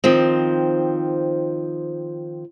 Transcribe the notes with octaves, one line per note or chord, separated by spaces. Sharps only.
D#3 F3 C4